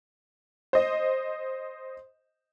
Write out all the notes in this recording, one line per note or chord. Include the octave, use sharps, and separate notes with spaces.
C5 D#5